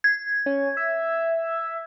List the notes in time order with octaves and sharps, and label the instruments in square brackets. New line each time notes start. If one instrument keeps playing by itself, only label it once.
[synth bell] G#6
[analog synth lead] C#4
E5